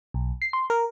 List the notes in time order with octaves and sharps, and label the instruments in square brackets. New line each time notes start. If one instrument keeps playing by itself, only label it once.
[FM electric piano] B1
C7
C6
A#4